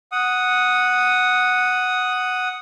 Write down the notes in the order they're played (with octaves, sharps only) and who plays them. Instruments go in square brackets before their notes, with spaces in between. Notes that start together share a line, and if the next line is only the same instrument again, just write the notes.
[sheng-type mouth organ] F#5 D#6